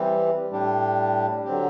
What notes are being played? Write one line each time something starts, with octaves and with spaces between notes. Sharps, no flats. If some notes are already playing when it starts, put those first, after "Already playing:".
Already playing: E3 G3 C4 G4
A2 G3 D4 G4
D3 F#3 C4 G4